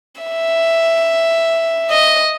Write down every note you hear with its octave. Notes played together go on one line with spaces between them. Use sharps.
E5
D#5